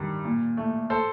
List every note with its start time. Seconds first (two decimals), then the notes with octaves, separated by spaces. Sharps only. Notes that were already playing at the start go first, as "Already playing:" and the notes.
Already playing: G2 D#3 G3
0.24 A#2
0.57 A3
0.90 A4 C5